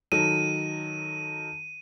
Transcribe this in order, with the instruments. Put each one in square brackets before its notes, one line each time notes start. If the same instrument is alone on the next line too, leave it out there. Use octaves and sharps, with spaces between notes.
[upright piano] D#3 F#3 A4 [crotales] D#7